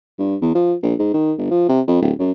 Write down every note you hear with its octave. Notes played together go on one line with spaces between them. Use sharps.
G2
E2
F3
A#1
G#2
D#3
G1
F3
C3
F2
D1
F#2